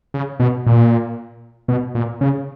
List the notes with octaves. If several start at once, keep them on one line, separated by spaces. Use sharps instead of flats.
C#3
B2
A#2
B2
A#2
C#3